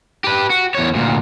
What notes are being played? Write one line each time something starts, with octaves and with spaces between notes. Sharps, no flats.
G4 B4
F#4
E2 C#5
D2 A#2